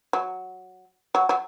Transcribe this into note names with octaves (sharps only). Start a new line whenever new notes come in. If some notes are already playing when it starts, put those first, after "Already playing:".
F#3
F#3
F#3